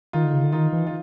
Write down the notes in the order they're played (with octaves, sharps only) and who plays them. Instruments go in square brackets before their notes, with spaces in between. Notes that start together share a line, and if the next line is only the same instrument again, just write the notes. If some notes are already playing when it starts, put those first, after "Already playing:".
[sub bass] D#3 [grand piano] D#4 F4
[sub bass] D3
C#3
D3
[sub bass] D#3 [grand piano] D#4 F4
[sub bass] E3
[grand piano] F4